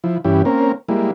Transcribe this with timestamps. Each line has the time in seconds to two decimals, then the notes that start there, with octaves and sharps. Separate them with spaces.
0.04 F3 E4
0.24 G2 E3 C#4 E4 G4
0.45 A#3 C4 C#4 A#4
0.89 G3 G#3 A#3 E4